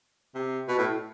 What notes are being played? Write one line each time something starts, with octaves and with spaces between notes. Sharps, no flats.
C3
B2
A2